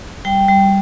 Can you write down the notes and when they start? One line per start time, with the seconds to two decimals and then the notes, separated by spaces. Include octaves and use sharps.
0.25 G3 G5
0.48 G3